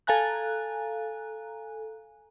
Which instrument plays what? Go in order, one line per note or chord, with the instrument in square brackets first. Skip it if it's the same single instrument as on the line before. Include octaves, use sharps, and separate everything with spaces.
[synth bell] A4 F5 G#5 A#5 F#6